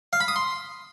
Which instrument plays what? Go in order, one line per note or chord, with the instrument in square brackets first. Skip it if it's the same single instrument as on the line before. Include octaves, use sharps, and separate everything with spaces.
[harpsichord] F5
B5
D#6
C6